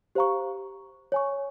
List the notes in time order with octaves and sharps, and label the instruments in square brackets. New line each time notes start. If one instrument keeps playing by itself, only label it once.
[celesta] G4 C5 F5 A#5 C#6
C#5 G#5 C#6